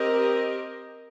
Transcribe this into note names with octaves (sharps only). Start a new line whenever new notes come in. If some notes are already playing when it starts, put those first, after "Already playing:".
Already playing: C4 G4 A#4 D#5